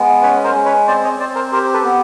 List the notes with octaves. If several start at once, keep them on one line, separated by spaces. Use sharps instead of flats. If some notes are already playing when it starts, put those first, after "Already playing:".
Already playing: G#3 B3
C#4 B4 C#5
A#4 C5
G#3
B4 C#5
C4 C5 D5
C#5 D#5
C4 C5 D5
A#4 C5
G4 A#4 C5
A4 B4
B3